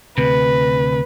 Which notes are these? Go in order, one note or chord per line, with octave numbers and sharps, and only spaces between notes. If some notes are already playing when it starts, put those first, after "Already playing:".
D2 C3 B4